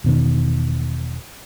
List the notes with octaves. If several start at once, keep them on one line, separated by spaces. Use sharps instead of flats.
E1 B2 D#3